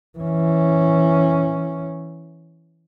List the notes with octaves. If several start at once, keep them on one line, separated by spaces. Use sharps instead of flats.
E3 C#4